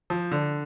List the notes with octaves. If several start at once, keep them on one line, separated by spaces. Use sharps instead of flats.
F3
D3